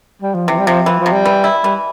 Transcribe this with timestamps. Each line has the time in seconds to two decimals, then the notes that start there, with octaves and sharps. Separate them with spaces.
0.22 G3
0.34 F3
0.48 C3 E3
0.58 G3
0.67 C3 F3
0.86 E3 F3
1.00 F3
1.06 C3
1.12 G3
1.25 E3
1.44 E4
1.63 E3 G3